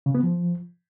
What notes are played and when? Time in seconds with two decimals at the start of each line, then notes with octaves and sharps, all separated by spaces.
0.06 C#3
0.15 B3
0.23 F3